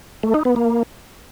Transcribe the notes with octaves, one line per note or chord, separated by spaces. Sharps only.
A3
D#4
B3
A#3